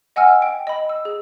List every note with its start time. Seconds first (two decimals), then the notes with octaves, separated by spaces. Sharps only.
0.16 D#5 F#5 G#5 E6 F6
0.42 G5
0.67 D#5 B5
0.89 E6
1.05 G#4